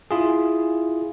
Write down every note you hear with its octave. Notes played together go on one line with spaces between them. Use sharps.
E4 F4 G#4